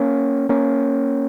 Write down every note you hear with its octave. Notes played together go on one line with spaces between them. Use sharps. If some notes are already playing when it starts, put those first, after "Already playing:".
Already playing: A#3 C#4
A#3 C#4